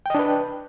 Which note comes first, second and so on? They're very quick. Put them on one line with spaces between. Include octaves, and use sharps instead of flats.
G5 D#5 D4 B4